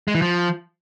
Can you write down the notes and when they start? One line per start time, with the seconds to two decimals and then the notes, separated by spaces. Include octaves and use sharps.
0.08 G#3
0.15 E3
0.22 F3